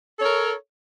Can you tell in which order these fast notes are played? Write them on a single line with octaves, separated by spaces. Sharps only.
A4 C#5 A#4